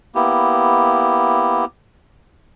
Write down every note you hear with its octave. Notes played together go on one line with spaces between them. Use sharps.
A#3 B3 E4 G4